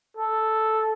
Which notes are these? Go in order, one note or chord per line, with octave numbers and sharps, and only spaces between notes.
A4